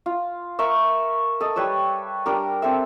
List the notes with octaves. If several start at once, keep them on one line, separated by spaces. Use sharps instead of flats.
F4
A#4 E5 C#6
A4 D#5
G3 B4 C#5 E6
G3 D4 A#4
C4 A4 E5